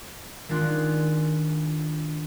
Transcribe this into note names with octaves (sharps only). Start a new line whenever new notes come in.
D#3 G#3 D4 F4 F#6